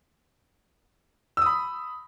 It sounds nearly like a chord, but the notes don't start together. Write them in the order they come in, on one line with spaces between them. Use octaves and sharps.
E6 D#6 B5